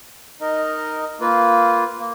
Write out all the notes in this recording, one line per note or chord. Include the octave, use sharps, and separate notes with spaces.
D#4 A#4 D#5
A#3 F4 B4
A#3